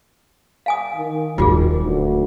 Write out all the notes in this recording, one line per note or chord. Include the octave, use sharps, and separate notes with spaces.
F5 G#5 D#6
D#3
D#1 D#3 F#3 F4 F#4 G#4
D2